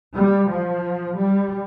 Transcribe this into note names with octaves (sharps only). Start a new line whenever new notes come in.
G3
F3
G3